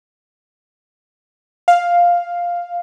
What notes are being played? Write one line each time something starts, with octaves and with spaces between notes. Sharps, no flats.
F5